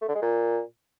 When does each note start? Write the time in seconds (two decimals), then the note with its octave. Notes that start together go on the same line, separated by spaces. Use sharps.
0.01 A3
0.08 D3
0.15 G#3
0.22 A#2